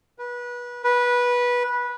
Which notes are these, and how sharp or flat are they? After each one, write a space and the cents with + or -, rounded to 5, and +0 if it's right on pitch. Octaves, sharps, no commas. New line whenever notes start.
B4 -25
B4 -15